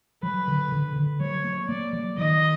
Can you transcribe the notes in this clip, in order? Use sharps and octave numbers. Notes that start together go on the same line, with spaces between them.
F#3 B4
D3
D3
D3
F#3 C#5
A#3
A#3 D5
F#3
D#3 D#5